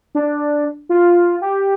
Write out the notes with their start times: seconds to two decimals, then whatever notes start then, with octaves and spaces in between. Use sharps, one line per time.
0.15 D4
0.89 F4
1.41 G4